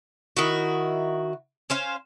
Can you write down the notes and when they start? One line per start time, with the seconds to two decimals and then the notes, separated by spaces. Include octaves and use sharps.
0.37 D#3 E4 F#4
1.70 C#4 C5 F5